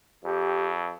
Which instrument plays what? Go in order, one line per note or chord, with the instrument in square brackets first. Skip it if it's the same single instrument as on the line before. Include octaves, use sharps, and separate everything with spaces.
[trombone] F2 [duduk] G4